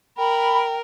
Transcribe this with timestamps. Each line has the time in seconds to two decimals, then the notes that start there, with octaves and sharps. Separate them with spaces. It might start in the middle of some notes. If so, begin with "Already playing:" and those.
0.18 A#4 G5 B5